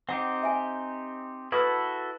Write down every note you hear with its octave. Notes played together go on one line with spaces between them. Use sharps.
C4 D#4 G4 F#5
E5 G#5
E4 F#4 A4 B4 D#6 E6